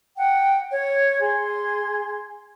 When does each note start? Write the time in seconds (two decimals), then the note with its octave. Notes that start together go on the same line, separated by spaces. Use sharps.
0.17 F#5 G5
0.69 C#5
1.20 G#4 C6